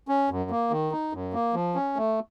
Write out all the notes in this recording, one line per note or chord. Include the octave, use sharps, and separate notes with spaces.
C#4
F#2
A#3
D#3
D#4
F#2
A#3
F3
C#4
A3